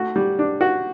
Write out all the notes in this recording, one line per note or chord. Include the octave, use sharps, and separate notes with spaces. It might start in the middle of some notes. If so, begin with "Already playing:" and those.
Already playing: A3 F#4
G3
D4
F#4